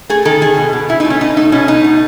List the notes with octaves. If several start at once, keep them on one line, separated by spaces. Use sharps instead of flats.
A3 G#4
D#3 A4
D#3 G#4
B2
B2
B2 E4
D#4
A3
C#4
B2 D#4
A3 D#4
B2 C#4
B2 D#4
A3